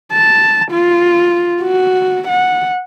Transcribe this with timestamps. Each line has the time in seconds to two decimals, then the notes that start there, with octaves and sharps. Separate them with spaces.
0.12 A5
0.72 F4
1.62 F#4
2.28 F#5